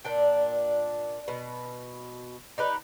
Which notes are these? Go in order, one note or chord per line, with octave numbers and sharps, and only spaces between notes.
A#2 D4 G5
B2
D#4 G4 B4